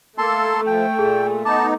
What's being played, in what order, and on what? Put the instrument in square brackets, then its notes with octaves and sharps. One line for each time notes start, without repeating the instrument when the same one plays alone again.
[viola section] A3 [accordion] A#3 A4 [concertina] A5 C6
[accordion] F3 [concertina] G5
[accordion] A#2 [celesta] G#4
[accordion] B3 D#4 [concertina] A5 [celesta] D6